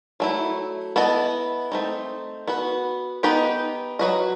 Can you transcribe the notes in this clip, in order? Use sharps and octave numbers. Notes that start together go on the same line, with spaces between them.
F#3 A3 E4
B3 E4 A4 D#5
A3 C4 D#4
B3 F#4 B4
B3 D#4 G4 B4 D#5
F#3 C4 F#4 B4 D#5